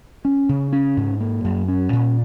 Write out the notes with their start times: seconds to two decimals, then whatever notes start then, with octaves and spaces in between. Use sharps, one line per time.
0.25 C#4
0.49 C#3
0.72 C#4
0.97 G#2
1.20 A#3
1.44 F#2
1.68 C#4
1.93 A#2